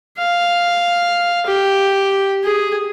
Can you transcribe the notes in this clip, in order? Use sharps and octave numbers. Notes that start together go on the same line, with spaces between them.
F5
G4
G#4